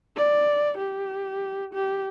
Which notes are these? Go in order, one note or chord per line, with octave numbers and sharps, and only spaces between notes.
D5
G4
G4